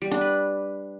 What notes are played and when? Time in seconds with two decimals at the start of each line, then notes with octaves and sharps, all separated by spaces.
0.02 G3
0.11 D4
0.21 B4